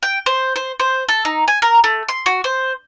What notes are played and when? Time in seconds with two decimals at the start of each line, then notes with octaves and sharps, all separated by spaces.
0.03 G5
0.26 C5
0.56 C5
0.80 C5
1.09 A4
1.25 D#4
1.48 G#5
1.62 A#4
1.84 A3
2.09 C6
2.26 F#4
2.44 C5